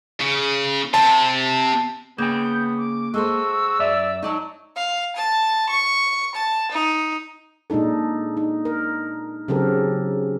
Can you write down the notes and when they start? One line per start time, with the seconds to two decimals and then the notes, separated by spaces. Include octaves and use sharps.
0.21 C#3
0.94 C3 A5
2.18 C#3 A#3 B3 G5 G6
2.77 D6
3.14 G#3 F#4 A4 C5 E6
3.79 F#2 D5 E5
4.23 F#3 D#4 D5 A5
4.76 F5
5.16 A5
5.71 C#6
6.35 A5
6.72 D#4
7.70 A#2 G#3 D4 D#4 A4
8.37 D#4
8.65 A#4
9.48 C#3 F#3 C4 G4 A4 A#4